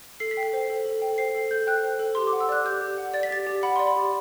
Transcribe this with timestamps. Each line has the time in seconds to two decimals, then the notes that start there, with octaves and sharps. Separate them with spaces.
0.20 A4 C7
0.31 B6
0.37 G5
0.43 C7
0.53 C5
0.70 A4
0.86 A4
1.02 G5
1.18 C5 C7
1.35 A4
1.51 A4 G6
1.67 G5 F#6
1.84 C5
1.99 A4
2.15 G4 C6
2.27 D6
2.33 F#5
2.41 E6
2.49 D5 F#6
2.65 G4 G6
2.81 G4
2.98 F#5
3.14 D5 A6
3.23 B6
3.31 G4 A6
3.47 G4
3.63 F#5 B5
3.76 D5 C6
3.87 B5
3.96 G4